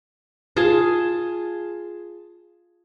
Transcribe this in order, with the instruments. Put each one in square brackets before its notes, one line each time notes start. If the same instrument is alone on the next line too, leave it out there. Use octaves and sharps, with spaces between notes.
[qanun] F4 G#4 A5